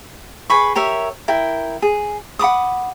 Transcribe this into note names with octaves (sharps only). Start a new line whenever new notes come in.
G#4 B4 B5 C#6
G4 A#4 C#5 E5
E4 A#4 G5
G#4
F#5 B5 D6 D#6